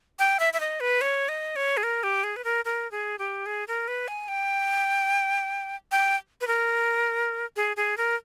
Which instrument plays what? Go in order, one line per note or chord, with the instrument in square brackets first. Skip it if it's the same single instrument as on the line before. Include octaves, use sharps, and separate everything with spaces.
[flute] G5
E5
E5
D#5
B4
C#5
D#5
C#5
G#4
A#4
G4
G#4
B4
A#4
A#4
G#4
G4
G#4
A#4
B4
G#5
G5
G5
B4
A#4
G#4
G#4
A#4